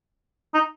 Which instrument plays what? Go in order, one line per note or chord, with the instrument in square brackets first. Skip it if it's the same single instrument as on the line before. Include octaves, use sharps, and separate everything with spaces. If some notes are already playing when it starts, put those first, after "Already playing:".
[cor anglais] D#4